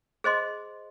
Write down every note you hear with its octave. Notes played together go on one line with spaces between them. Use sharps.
G#4 C5 D#5 C6